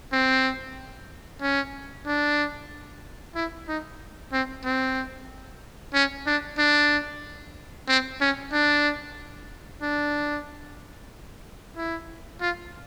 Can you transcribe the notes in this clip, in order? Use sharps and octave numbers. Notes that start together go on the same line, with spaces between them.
C4
C#4
D4
E4
D#4
C4
C4
C#4
D4
D4
C4
C#4
D4
D4
E4
F4